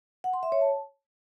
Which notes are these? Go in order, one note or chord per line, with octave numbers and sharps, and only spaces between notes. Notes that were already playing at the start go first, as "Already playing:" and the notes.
F#5
C6
E5
C#5
A5